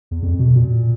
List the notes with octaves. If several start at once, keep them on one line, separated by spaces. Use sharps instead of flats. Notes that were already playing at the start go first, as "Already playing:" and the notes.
E2
F2
B2
A#2